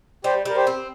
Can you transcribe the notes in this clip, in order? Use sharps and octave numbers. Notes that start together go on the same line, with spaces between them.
G3 G4 C5
G3 A#4
G4 C5
C4